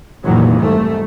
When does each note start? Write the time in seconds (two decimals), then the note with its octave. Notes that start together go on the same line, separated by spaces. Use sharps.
0.24 F1 D#2 A#2 D#3 E3 F#3
0.60 C2 G#2 A3